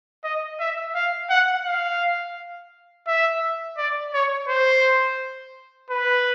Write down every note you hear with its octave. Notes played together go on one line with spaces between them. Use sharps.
D#5
E5
F5
F#5
F5
E5
D5
C#5
C5
B4